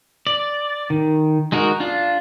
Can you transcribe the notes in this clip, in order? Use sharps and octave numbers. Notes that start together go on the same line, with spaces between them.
D5
D#3
G#3 D#4 F#4 A#4
D4 F4